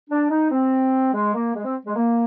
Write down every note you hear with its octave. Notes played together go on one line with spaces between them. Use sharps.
D4
D#4
C4
G#3
A#3
G#3
C4
G#3
A#3